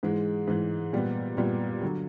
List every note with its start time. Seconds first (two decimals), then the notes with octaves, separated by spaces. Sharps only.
0.03 G#2 E3 G#3
0.47 G#2 E3 G#3
0.93 A#2 G3 B3
1.37 A#2 G3 B3
1.82 D3 F#3